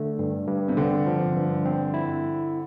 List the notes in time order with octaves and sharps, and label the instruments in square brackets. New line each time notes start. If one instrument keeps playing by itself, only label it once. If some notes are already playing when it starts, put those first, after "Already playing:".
Already playing: [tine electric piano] D3 A3
G2
G2
[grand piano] C3
[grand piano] D3 [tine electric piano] C4
[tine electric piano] F3
G2
C4
E4